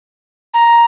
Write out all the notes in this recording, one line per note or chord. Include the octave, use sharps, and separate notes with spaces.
A#5